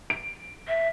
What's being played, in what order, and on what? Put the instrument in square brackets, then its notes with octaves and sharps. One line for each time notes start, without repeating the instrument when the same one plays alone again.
[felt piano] D7
[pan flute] E5